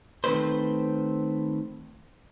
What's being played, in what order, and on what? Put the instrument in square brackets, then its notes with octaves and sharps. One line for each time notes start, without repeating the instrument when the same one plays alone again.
[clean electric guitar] D#3 A3 C4 B4 C5